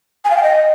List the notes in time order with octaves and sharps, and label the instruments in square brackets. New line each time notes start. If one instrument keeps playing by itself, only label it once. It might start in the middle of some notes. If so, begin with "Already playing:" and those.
[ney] G#5
F5
G5
D#5